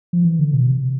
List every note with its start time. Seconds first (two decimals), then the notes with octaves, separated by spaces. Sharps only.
0.13 F3
0.24 E3
0.39 D3
0.54 B2
0.68 C3